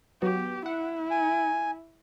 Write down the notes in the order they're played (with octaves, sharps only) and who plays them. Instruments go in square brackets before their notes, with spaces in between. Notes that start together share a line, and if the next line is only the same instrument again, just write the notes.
[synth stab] F#3 B3 F#4 [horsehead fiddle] G4
[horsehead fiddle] E4 [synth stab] F#5
[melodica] G#5